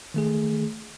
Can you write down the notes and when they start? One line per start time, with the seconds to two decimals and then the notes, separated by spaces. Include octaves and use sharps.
0.14 D#3 A3 G#4